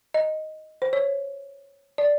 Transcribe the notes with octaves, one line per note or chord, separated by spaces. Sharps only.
D#5
C5
C#5
D5